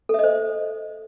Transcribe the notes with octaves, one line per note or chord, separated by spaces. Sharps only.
A4 C5 D#5 E5